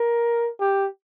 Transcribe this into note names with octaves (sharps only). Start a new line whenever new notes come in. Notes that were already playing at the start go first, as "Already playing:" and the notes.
Already playing: A#4
G4